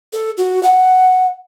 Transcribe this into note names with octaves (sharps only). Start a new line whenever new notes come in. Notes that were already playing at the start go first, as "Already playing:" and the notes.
A4
F#4
F#5